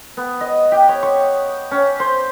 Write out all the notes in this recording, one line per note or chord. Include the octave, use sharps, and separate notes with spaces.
B3
D#5
G4
C#5
C#6
C#4
C5